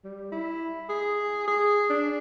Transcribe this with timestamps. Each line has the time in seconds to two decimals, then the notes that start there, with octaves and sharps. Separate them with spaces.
0.04 G3
0.32 E4
0.89 G#4
1.48 G#4
1.90 D4